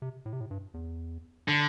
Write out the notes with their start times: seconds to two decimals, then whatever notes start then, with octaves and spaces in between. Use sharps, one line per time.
0.02 C3
0.26 A2
0.33 C3
0.40 A2
0.51 G2
0.74 E2
1.48 D3